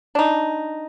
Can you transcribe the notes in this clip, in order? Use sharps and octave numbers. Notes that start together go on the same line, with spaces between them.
D4 D#4